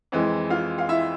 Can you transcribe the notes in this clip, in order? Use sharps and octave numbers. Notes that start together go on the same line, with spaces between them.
F2 E3 G#3
F4 F5
F5
E4 E5